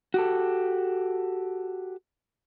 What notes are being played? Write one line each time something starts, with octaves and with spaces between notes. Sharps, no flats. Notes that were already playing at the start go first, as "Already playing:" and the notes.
F#4 G4 A4